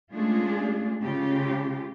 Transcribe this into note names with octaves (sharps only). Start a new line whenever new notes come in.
G#3 A3 C#4 D4 F4 G#4
C#3 G#3 F4 G4